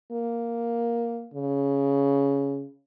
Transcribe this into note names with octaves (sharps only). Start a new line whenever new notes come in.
A#3
C#3